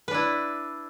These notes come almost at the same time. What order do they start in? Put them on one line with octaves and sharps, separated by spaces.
B4 D4 E4